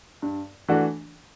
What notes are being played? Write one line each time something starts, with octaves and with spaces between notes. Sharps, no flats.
G2
E3 A3 D4 F#4